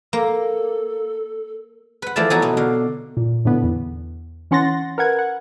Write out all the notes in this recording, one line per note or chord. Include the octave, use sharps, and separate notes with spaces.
A#3 A4
B4 F#5
E3 F3 A3 D5 F5 A5
E3 F#3 B3 D#4 F#4 A#5
B2 D#4
D3 F5
A#2
A2 D3 B3
E2
E3 C#4 F#5 C6 A6 A#6
A#4 B4 F#5 G#6
F#5